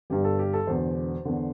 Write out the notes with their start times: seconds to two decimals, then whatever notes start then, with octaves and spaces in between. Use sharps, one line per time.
0.10 G1 G2 G3 G4
0.24 A4
0.39 G4
0.53 A4
0.67 E1 E2 D3 C5
1.25 E2 D3